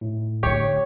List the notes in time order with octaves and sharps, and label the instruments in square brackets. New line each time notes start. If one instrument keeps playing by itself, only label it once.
[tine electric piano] A2
[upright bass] D3 A3 [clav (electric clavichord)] G4 [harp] C#5